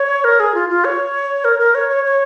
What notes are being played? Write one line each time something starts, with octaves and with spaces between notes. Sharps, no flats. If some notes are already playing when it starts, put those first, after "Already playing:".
Already playing: C#5
A#4
G#4
F4
F4
C#5
A#4
A#4
C#5
C#5
C#5